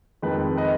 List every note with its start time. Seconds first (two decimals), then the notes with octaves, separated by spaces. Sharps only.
0.22 F2 D#3 G#3 B4
0.57 B4 D#5